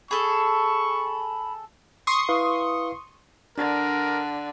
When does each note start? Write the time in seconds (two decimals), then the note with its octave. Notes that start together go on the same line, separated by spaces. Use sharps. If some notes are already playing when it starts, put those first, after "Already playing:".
0.11 G#4 A4 B5 C#6
2.07 C6 C#6 D#6
2.29 E4 B4 F5
3.57 D3 D4 A#4